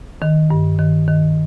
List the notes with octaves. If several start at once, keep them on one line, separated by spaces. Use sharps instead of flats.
D#3
G2
D#3
D#3